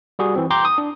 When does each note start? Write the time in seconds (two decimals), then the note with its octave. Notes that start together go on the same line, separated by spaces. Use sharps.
0.19 G3 F#4 G#4
0.36 E3 C4
0.50 G5 A#5 C6 D6 G6
0.65 D#6
0.78 D4